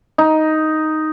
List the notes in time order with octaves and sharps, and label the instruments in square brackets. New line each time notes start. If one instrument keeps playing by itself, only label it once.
[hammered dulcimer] D#4